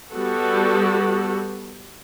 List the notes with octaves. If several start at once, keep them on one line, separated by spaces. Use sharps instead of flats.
G3 B3 F#4 A4